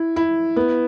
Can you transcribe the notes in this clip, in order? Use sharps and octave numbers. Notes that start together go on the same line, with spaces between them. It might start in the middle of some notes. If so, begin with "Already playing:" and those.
Already playing: E4
E4
B3